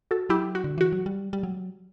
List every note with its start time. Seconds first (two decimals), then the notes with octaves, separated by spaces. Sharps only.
0.11 F#4 A4
0.29 F#3 E4 G4
0.55 F#4
0.64 D3
0.78 E3 F#4
0.93 F#3
1.06 G3
1.33 G3
1.43 F#3